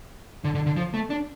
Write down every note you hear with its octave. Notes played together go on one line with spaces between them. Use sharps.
D3
D3
D3
F3
A3
D4